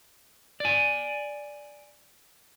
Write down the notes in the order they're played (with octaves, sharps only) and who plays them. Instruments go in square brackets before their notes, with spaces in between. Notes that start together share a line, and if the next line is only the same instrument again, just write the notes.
[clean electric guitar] D5 G#5